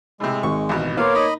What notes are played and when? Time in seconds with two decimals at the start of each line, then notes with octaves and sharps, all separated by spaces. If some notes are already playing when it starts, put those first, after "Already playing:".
0.20 A2 C3 G#3
0.43 G#1 C#6
0.69 A1 B2
0.97 A#3 B3 A#4 C#5 F5 C6 D6
1.15 D#4 D#5 B5